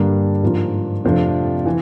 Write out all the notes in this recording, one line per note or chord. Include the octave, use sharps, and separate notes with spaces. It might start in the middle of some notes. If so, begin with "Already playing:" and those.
Already playing: G2 D3 G3 A#3 D4
G#2 F3 A#3 D4 F4
F2 C3 F3 A3 D4
E3